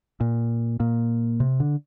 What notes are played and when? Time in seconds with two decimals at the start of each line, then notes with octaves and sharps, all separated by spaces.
0.20 A#2
0.80 A#2
1.40 C3
1.60 D3